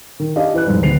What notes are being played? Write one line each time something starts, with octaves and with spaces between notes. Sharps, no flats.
D#3
C#4 D4 G4 D#5 F5
E3 B4 F#6
F2 G#2 G3
D1 G#1 B3 C7 F7